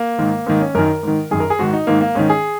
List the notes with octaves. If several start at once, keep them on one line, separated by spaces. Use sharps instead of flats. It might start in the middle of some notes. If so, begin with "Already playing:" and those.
Already playing: A#3
G#2 D#3
G#2 D#3 A#3
C#4
F#2 D#3 A#4
G#2 D#3
F#2 D#3 G#4
A#4
G#4
G#2 D#3 F#4
D#4
G#2 D#3 A#3
A#3
G#2 D#3 C#4
G#4